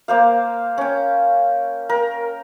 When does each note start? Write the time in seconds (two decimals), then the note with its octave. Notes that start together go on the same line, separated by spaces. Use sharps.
0.08 A#3 C5 F5
0.78 C#4 G5
1.89 A#4 G5